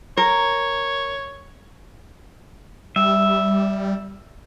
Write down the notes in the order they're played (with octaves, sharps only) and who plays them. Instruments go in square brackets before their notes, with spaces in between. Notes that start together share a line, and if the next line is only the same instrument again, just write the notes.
[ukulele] A#4 [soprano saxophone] C#5
[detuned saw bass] G3 [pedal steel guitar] E5